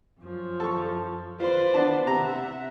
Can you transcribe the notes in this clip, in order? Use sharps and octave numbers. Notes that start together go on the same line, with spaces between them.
F#2 F3
A4 C#6
F4 B4 C5 D5 C6
B3 D4 A5
C3 E5 F#5 A#5